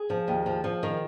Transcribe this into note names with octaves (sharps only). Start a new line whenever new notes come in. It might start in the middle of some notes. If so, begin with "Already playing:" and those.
Already playing: G#4
F3
D#2
F3
F3
D#3